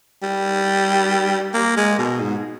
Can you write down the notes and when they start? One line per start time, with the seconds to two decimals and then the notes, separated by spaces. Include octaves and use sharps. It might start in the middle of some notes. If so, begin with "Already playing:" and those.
0.23 G3
1.54 A#3
1.77 G#3
1.99 B2
2.21 G#2